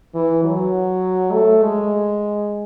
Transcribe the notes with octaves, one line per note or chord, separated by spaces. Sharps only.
E3
F#3
A3
G#3